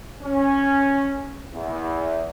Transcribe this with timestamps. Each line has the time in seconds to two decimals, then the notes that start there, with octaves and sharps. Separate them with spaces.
0.23 C#4
1.53 E2